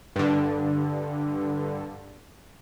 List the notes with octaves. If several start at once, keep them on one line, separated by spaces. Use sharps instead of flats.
G2 D3